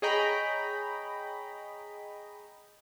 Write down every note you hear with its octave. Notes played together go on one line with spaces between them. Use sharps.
G#4 C#5 D#5 G5 A#5 B5